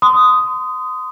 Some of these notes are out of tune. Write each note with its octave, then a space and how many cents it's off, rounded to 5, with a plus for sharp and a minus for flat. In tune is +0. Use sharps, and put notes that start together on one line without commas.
C6 -30 D#6 +0